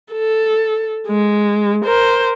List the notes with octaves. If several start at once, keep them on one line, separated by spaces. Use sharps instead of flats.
A4
G#3
A#4 C5